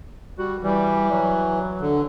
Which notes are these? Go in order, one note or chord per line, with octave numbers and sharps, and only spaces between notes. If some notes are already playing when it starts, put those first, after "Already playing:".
G3 F#4
E3 G3
F#3
D3